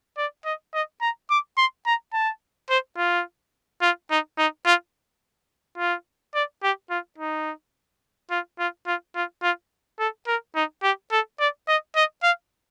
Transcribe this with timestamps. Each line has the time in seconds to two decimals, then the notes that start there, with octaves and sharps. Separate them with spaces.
0.18 D5
0.45 D#5
0.74 D#5
1.01 A#5
1.30 D6
1.57 C6
1.86 A#5
2.13 A5
2.70 C5
2.97 F4
3.82 F4
4.11 D#4
4.38 D#4
4.66 F4
5.78 F4
6.35 D5
6.63 G4
6.90 F4
7.18 D#4
8.31 F4
8.59 F4
8.87 F4
9.16 F4
9.43 F4
9.99 A4
10.27 A#4
10.56 D#4
10.83 G4
11.11 A4
11.40 D5
11.68 D#5
11.96 D#5
12.23 F5